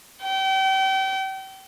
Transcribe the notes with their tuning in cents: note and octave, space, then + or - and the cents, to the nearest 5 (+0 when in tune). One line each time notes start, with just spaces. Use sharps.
G5 -35